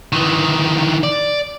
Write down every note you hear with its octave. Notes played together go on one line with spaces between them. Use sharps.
D#3 E3
D5